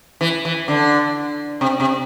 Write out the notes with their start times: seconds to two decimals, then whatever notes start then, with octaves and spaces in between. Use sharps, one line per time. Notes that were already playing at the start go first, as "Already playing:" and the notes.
0.21 E3
0.45 E3
0.68 D3
1.61 C3
1.80 C3